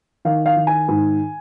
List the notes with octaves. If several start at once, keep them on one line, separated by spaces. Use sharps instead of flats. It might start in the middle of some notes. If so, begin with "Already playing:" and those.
D#3 F5
F5
D#3
G#5
G#2